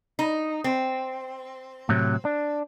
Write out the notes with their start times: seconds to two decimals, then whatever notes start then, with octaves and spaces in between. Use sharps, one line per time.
0.19 D#4
0.64 C4
1.89 A2 C3 F#3
2.25 D4